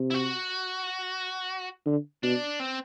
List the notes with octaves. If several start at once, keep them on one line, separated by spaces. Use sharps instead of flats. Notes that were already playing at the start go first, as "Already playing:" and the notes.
Already playing: C3
E4
F#4
D3
B2 D4
C4